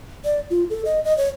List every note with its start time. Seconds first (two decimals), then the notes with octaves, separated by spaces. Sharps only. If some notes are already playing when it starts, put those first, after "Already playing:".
0.25 D5
0.50 F4
0.70 A4
0.85 D#5
1.04 D#5
1.17 C#5